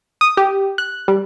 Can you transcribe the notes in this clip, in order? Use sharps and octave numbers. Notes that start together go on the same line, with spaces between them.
D#6
G4
F#6
G3